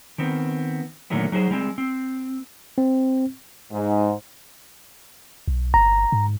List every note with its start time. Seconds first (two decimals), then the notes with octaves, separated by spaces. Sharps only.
0.18 D#3 B3 C4
1.10 A#2 D3 D#3 F#3 A3 B3
1.32 F#3 D#4 G#4 C5
1.51 G3 G#3 C4
1.78 C4
2.78 C4
3.72 G#2
5.48 B1
5.74 G1 A#5
6.12 G#2